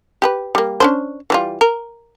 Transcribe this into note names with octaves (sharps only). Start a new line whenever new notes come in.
G4 G#4 B4
G3 A#3
C#4 D4 C5
E3 G3 F4
A#4